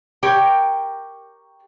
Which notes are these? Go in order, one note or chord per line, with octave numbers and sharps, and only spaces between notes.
G4 A#4 C#5 G5